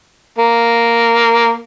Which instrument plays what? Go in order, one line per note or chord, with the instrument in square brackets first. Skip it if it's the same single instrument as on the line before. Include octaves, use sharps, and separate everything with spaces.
[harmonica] A#3